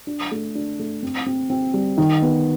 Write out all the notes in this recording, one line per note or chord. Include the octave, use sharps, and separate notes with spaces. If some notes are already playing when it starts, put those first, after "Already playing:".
D4
A3
D4
A3
C4
C4
C4
G3
D#3
B3